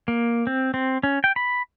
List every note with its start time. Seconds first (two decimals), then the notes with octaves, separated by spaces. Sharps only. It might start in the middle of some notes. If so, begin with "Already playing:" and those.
0.08 A#3
0.47 C4
0.74 C4
1.03 C#4
1.24 G5
1.36 B5